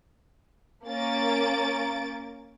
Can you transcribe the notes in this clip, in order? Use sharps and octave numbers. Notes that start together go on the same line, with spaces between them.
A#3 C#4 A6 D7